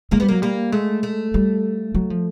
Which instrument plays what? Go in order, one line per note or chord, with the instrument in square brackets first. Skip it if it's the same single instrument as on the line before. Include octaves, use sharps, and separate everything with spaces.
[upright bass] G#3 [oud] A#3
[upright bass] G3 [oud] B3
[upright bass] F#3 [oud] A#3
[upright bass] G3 [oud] A#3
[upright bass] G#3 [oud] A3
[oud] A3
[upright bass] G3
F#3
F3